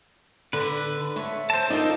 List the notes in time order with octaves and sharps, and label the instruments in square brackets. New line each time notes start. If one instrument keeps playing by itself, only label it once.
[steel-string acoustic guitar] D3 [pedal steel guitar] B4
[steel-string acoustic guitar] A3 C#5
[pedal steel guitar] C5 A5
[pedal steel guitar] D4 A4 [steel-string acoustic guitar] D#4 F4 A#4